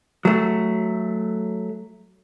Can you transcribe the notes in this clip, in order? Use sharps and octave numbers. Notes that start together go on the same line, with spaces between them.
F#3 A3